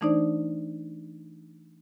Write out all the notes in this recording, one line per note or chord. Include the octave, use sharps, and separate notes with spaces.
E3 A3 D4 D#4 C5 D5